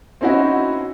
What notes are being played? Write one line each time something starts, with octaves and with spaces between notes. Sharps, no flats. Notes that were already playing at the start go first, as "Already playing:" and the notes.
C4 C#4 D#4 E4 F#4